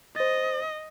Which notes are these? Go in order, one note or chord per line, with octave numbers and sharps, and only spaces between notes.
C5 D#5 A6